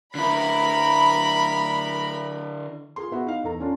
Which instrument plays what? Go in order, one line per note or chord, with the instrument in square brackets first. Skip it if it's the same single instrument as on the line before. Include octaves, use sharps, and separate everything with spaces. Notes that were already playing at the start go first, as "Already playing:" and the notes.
[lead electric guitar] D3 E4 [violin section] A#4 B5
[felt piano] F4 G#4 C6
B3 E4 F#4
D#4 F5
E2 A4 A#5
C#4 D4 F4